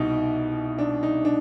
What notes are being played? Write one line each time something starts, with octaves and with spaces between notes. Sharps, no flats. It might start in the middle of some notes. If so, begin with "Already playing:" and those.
Already playing: C2 B2 D#4
D4
D#4
D4